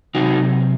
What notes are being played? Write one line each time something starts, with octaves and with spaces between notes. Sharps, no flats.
C3 F#3 C4 D#4 F#4